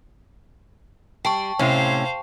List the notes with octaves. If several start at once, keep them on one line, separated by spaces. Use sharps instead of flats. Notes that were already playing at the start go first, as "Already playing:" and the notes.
G3 G5 A5 C#6
A2 C3 C#4 C5 F5